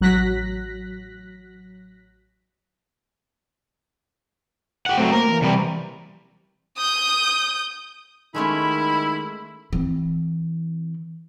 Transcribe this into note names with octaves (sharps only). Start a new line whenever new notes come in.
A1 F#3 F#6 A#6 B6
G4 F#5
F#3 A3 C4
A#3 A#4
E3
C3 G3
D#6 G6
D#3 G#3 A3 C#4 E4 B5
E3 C4